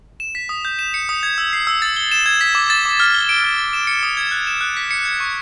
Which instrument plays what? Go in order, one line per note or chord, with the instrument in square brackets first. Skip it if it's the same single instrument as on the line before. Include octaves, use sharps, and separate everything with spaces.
[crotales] E7
B6
D#6
G6
E7
C#7
D#6
G#6
E6
C7
E6
A6
G7
E7
G#6
B6
D6
A6
D6
F6
G7
D7
F6
A6
E7
C#7
D#6
G#6
F#6
E7
F#6
B6
C#7
G#6
C#6